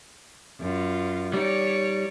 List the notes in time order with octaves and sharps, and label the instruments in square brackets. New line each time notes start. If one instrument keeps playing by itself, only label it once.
[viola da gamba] F#2 F4
[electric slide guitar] G3 D#4 [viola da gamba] C#5 D5